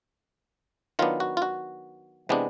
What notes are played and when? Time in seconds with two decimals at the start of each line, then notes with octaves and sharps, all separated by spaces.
0.99 D#3 F#3 B3 D4 F4
1.20 F#4
1.37 F4
1.42 F#4
2.29 C3 E3 G#3 B3 D4